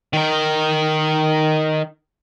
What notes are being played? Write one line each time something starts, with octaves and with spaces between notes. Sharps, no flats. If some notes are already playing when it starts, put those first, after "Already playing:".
D#3 A#4